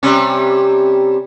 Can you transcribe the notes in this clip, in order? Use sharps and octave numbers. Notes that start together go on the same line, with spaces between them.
C3 G3 C#4